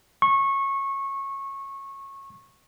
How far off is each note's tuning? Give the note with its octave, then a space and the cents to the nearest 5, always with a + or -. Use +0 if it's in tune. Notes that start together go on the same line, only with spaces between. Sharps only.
C#6 -20